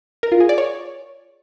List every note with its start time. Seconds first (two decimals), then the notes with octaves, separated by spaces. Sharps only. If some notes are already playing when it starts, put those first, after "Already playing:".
0.23 A#4
0.32 F4
0.40 G#4
0.49 D5
0.58 C#5